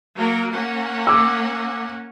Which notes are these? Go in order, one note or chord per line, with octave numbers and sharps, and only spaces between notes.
F#3 A#3 A#4
A#3 C#4 F#5
D6 E6